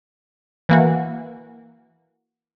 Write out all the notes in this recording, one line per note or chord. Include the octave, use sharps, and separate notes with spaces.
E3 A#3 F#4